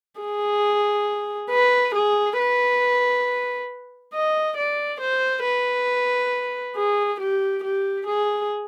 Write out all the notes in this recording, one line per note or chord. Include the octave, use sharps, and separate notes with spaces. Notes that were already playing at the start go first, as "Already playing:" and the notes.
G#4
B4
G#4
B4
D#5
D5
C5
B4
G#4
G4
G4
G#4